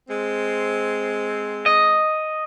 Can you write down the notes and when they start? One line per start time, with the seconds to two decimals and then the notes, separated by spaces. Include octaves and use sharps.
0.09 G#3 C4
1.66 D#5